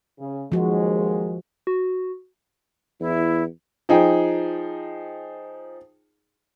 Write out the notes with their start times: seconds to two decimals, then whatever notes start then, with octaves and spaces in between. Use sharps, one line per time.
0.19 C#3
0.52 D#2 F3 G#3 F#4
1.67 F#4
3.00 E2 E4
3.89 F3 D#4 G#4 G5